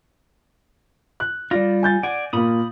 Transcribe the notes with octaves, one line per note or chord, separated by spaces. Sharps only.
F#6
G3 F4 D5 A#6
G#5 G6 A6
D5 F#5 G#5
A#2 A#3 B5 D#6